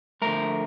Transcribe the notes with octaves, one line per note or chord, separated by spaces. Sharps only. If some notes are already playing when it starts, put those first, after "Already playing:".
D3 F3 A3 A#4